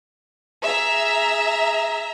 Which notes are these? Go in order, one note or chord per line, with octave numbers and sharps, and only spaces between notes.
G#4 E5 A#5